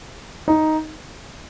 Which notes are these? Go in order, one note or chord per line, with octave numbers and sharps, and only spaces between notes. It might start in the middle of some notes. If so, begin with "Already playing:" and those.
D#4